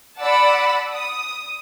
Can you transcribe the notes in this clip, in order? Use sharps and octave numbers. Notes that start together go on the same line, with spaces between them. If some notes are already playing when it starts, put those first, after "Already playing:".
D5 F#5 A5 B5 D6 E6
D#6